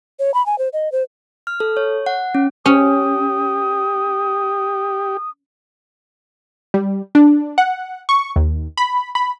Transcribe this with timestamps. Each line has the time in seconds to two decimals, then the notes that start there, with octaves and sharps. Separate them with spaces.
0.19 C#5
0.34 B5
0.46 G#5
0.58 C5
0.73 D#5
0.92 C5
1.47 F6
1.60 A4
1.77 C#5
2.06 F#5
2.35 C#4
2.66 C#4 G4 D#6
6.74 G3
7.15 D4
7.58 F#5
8.09 C#6
8.36 D#2
8.77 B5
9.15 B5